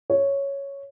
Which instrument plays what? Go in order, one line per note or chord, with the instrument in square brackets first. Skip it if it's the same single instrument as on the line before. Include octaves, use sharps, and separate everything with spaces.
[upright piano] C#5